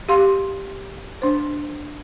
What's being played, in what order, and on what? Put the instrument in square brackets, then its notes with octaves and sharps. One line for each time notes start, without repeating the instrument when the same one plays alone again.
[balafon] G4 F5 C6
D4 C5